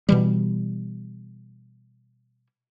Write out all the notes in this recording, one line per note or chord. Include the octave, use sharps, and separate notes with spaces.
B2 E3 G3